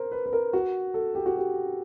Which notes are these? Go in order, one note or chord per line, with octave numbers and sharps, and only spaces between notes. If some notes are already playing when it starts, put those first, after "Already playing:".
Already playing: A#4 C5
B4
B4
A#4
F#4
A4
G4
F#4
G4